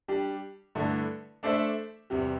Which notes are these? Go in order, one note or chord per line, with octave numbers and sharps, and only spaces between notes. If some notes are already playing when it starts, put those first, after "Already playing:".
G3 D4 G4
G2 D3 A3 E4
A3 D4 A4 C5 E5
E2 C3 G3